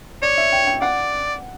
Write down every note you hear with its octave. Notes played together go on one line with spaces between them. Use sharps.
C#5 D5
E5
G5
G5
D5 F#5